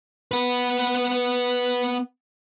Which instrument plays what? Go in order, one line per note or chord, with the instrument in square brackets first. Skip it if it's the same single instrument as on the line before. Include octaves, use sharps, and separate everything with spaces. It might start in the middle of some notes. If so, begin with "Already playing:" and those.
[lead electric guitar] B3 B4